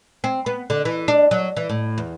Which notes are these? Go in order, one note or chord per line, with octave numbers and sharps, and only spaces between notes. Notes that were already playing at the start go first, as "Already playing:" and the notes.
C4
B3
D3
E3
D4
F#3
E3
A2
E2